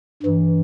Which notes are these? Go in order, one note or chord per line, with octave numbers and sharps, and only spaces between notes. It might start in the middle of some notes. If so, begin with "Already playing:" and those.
G2 E3